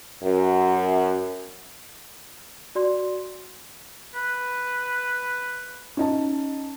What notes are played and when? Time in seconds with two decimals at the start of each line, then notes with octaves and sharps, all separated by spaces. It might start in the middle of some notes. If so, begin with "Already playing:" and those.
0.23 F#2
2.75 F#4 D5 C6
4.15 B4
5.97 C#4 D#4 A5